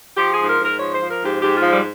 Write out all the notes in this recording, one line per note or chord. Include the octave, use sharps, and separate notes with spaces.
F3 G4
G#4
G#2
A#4
G#2
A#4
F3 C#5
C5
F3
A#4
G#2 G4
G#2 G4
F4
F3
G3